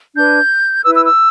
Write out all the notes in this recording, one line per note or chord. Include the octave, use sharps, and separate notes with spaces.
D4 B4 G6
E4 B4 E6
E6
E6